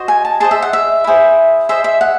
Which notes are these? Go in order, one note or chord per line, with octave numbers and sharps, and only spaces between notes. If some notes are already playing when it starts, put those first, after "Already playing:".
Already playing: F#4 C5 D#5
G#5
A5
G#4 C5 D#5 A5
E5
F#5
E5
E4 G#4 C5
G#4 C5 D#5 E5
E5
F#5